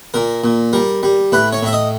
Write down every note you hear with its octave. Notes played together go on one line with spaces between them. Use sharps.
A#2 A#4
A#2
G3 A#4
G3
A2 B4
C#5
A2 E5
D#5